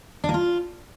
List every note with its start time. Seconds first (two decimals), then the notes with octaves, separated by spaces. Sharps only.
0.24 D4
0.29 A#3
0.34 F4